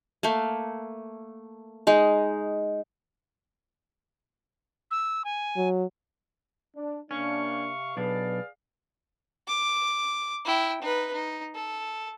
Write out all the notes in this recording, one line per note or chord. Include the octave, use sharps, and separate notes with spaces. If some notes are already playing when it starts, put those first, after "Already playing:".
A3 A#3
G#3 D#4
E6
G#5
F#3
D4
C3 A#3 C#4 D4 F5 C#6
B1 D4 G#4 B4 D5 F5
D6
E4 G5
D#4 B4
D#4
A4